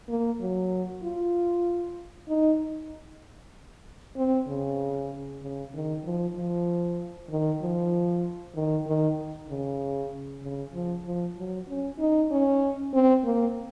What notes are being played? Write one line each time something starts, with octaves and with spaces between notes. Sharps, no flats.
A#3
F#3
F4
D#4
C4
C#3
C#3
D#3
F3
F3
D#3
F3
D#3
D#3
C#3
C#3
F3
F3
F#3
C#4
D#4
C#4
C4
A#3